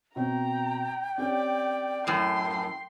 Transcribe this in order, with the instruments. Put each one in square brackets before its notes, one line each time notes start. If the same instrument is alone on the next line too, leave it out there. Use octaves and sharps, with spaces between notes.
[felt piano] B2 C4 [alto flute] G5 [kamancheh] A#5
[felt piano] C4 C#4 G4 [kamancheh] D5
[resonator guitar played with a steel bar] F#2 A2 [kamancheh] C6